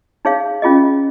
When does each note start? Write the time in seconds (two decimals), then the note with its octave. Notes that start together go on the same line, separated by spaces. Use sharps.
0.25 D#4 G#4 C#5 F5
0.62 C#4 F4 G#4 D#5